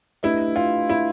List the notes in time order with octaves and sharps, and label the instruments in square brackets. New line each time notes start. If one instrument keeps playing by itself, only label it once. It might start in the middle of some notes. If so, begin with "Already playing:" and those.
[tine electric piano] A3 D4 G4 B4 D#5 [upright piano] E4
[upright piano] F4
E4